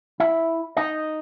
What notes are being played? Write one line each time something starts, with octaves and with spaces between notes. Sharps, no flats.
E4 E5
D#4 D#5